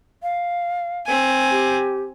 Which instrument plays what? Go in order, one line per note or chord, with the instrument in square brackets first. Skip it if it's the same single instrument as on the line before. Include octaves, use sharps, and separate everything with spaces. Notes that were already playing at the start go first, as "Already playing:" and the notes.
[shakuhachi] F5
[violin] C4 G#5
[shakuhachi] G4